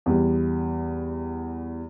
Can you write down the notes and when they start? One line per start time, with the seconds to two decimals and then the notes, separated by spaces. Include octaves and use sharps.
0.06 E2 G3